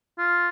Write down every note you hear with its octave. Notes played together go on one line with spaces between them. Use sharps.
F4